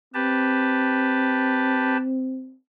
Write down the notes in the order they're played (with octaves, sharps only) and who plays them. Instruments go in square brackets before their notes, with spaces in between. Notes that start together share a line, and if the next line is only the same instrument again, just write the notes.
[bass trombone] C4 [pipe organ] G4 B4 A5